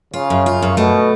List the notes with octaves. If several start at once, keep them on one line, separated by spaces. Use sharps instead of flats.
C#3 F4
F#2
F4
F#2
B2 A3